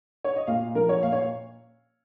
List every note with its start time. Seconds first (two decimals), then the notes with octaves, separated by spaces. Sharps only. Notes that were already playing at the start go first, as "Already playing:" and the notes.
0.24 C#5
0.36 D#5
0.47 A#2 F5
0.75 F3 A#4
0.89 C#5
1.03 A#2 F5
1.12 C#5